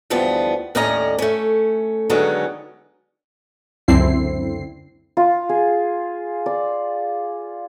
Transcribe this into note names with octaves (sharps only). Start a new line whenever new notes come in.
D2 E3 F3 G3 B3
D#2 A2 C#4 D5 D#5 A#5
A3 C#4
D3 D#3 F#3 G#3 B3 C#4
C#2 F#2 D3 C4 E4 C7
F4
G#4
D5